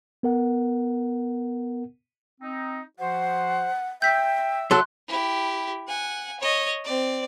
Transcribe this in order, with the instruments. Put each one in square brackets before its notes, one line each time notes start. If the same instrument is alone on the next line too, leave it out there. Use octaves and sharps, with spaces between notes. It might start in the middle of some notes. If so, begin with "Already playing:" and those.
[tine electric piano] B3 A#4 F#5
[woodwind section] C4 D#4
[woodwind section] F3 F#4 C5 [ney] F#5
[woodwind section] E5 [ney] G5 [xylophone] G6 B6
[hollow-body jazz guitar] F#3 A4 [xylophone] C6 F#6
[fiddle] E4 G4
F#5 G#5
C#5 D#5
C4 D5